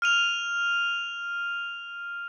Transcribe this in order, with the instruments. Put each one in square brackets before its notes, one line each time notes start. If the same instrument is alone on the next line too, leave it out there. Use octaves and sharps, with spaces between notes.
[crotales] F6 D#7 F7